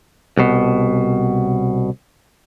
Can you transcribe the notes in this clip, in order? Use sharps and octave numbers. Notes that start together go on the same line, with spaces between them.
C2 B2